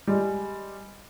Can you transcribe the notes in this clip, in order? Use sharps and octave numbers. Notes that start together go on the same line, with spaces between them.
G3 G#3